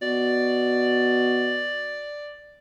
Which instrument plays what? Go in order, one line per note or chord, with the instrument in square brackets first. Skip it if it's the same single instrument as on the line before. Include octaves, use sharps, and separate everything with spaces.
[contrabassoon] B2 [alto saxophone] D5